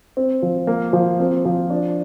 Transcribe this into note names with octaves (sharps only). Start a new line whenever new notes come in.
C4
F3
A#3
F3
C4
F3
D4